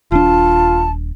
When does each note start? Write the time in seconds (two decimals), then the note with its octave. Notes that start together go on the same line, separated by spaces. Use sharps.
0.12 D#1 D4 F4 A5